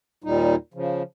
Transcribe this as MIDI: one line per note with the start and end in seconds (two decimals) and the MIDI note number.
0.24 0.55 39
0.24 0.55 46
0.24 0.55 55
0.24 0.55 63
0.74 1.03 49
0.74 1.03 53